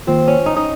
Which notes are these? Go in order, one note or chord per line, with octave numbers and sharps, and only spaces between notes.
D#3 A#3 C4 F4
C#4
D#4
D#4